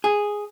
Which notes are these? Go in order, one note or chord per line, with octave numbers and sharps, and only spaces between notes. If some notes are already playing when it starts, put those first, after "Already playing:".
G#4